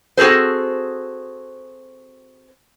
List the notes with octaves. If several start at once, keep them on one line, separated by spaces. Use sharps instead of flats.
C4 F#4 G#4 A4 C5